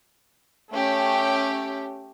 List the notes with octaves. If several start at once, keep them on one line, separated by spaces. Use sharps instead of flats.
A3 C#4 G4 G5